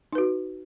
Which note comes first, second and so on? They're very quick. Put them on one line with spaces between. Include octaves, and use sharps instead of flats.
D#4 B4 F#4